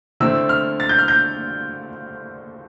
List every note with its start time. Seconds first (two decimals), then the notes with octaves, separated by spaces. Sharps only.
0.20 D3 A3 C4 E4 E6
0.49 F6
0.80 A6
0.89 G6
0.99 F6
1.08 G6